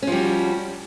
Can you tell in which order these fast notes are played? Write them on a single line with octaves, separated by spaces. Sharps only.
C#4 F3 G3 F#4